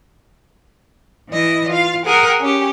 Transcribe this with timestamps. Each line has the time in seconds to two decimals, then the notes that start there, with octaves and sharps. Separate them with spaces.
1.30 E3 E4 D#5
1.69 F4 F5
2.05 G#4 A#4 F#5 G5
2.40 C#4 G4